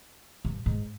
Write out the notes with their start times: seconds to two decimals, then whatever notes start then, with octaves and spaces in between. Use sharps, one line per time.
0.45 G2
0.66 G#2